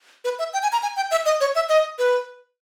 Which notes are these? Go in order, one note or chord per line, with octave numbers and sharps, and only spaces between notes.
B4
E5
G5
G#5
A#5
G#5
G5
E5
D#5
C#5
E5
D#5
B4